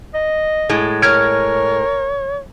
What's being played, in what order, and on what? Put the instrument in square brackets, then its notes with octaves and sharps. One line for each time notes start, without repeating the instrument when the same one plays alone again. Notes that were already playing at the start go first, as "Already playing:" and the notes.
[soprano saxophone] D#5
[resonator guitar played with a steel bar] A2 G#3
[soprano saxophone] A#4 [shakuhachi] C#5 [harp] F6 G#6 D7